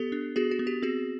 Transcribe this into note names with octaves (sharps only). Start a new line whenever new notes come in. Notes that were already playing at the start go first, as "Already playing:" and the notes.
Already playing: B3 G4 A4
D4
B3 F#4 G#4
F#4
B3
G4
C4 F#4 G#4